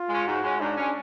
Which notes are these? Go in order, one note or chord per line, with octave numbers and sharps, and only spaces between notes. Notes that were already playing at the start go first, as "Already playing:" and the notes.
Already playing: F4
G#3 C#4
G#2 F#4
G#3 C#4
G#2 D4
G#3 C#4